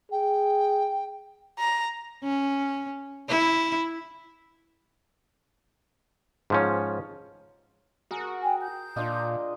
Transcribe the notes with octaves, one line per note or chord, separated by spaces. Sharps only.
G#4 G5
A#5
C#4
E4
G#2 F3 C#4
F#4 G#4 A#4
G5 G#5
G6
A#2 D4 F4 D#5